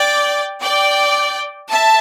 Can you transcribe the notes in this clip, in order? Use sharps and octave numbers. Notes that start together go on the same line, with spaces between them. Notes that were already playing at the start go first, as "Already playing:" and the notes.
Already playing: D5 G5
D5 G5
E5 A5